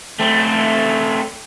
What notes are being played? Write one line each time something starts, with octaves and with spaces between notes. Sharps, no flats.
A3 C4